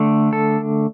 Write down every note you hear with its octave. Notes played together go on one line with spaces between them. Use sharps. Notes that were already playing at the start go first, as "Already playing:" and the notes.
Already playing: D3 A3
A4